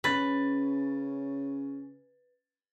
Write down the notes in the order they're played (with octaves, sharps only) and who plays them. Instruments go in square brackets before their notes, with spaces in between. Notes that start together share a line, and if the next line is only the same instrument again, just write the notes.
[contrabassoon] C#3 [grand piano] C#4 A6 [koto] B4